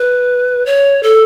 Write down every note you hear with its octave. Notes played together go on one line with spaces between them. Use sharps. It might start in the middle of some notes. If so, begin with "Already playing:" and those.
Already playing: B4
C#5
A4